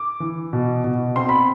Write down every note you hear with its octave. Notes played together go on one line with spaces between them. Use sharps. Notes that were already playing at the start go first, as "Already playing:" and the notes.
Already playing: D6
E3
B2
B2
C4 C6
B5